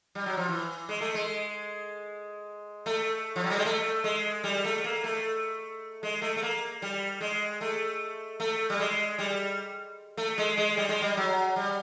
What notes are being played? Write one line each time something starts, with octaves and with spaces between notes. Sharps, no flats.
G3
F#3
F3
E3
G#3
A3
G#3
A3
F3
F#3
G3
G#3
A3
G#3
G3
A3
A#3
A3
G#3
A3
A3
A#3
G3
G#3
A3
A3
G3
G#3
G3
A3
G#3
G#3
G3
G#3
G3
F#3
G3